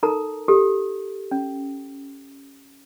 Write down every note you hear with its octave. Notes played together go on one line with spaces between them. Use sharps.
D#4 A4 A#4 A#5
G4 A4
C#4